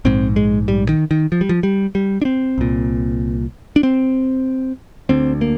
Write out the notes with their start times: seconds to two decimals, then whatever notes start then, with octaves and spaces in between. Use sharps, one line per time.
0.05 A#1 G#2 C4
0.36 G#3
0.68 G3
0.89 D#3
1.11 D#3
1.32 F3
1.41 G3
1.49 F3
1.63 G3
1.95 G3
2.22 D4
2.25 C4
2.58 C2 A#2
3.76 D4
3.83 C4
5.09 D2 D3 C4
5.41 A#3